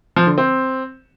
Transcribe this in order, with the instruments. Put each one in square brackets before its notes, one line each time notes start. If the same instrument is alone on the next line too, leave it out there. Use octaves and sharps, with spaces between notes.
[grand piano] F3
D3
C4